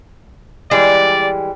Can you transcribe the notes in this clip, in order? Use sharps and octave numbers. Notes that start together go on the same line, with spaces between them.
E3 G3 G#3 D5